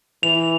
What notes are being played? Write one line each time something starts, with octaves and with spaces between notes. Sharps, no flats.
E3 F7